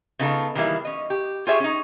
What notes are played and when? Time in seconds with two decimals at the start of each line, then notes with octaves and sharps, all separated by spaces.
0.19 C#3 B3 D#4 F4 G4 A4
0.55 D#3 E3 G3 A#3 E4 G#4
0.85 C#4 D#5
1.10 G4
1.47 F4 G4 G#4 C#5 E5
1.60 C#4 D#4